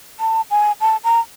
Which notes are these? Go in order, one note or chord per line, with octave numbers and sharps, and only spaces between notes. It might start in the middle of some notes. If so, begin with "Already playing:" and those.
A5
G#5
A5
A#5